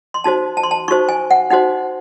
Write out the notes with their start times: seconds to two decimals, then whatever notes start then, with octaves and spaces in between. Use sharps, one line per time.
0.14 C6
0.24 D#4 F#4 C5 A5
0.57 A5
0.63 C6
0.71 A5
0.88 D#4 F#4 C5 C#6
1.09 G#5
1.31 F#5
1.50 D#4 F#4 C5 F#5